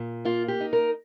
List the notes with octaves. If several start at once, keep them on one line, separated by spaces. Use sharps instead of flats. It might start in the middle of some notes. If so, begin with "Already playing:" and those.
Already playing: A#2
A#3 F4
G4
D#4
A#4